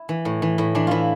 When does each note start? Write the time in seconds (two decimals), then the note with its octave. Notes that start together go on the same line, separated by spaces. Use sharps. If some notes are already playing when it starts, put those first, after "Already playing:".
Already playing: E4
0.09 E3
0.25 A2
0.42 E3
0.58 A2
0.75 E3 D4
0.87 E3 E4 F4